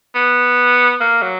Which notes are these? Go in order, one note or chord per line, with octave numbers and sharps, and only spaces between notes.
B3
A#3
F#3